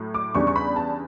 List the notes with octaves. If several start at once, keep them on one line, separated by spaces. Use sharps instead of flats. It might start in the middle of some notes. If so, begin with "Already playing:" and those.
Already playing: A2 F#3
D6
E2 C#3 G3 D4 C#6
C#6
B5
A5